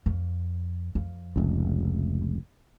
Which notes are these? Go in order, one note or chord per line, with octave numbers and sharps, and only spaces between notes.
F2
F2
F1 C#2